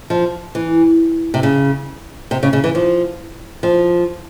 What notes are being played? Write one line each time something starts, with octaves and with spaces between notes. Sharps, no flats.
F3
E3
C3
C#3
C3
C#3
C#3
E3
F3
F3